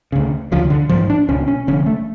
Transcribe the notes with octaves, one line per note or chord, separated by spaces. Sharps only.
D2 C#3
D2 C#3 F3
D3
A1 G#2 F3
D4
C#2 B2 C#4
C#4
F1 F2 D3 C#4
A3